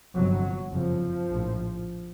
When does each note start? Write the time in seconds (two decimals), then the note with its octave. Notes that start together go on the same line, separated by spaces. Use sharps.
0.14 G1 F2 C3 F#3
0.71 F#1 F2 C3 F3
1.28 A#1 A2